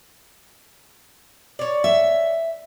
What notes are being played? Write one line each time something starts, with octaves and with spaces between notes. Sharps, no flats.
C#5 D5
E5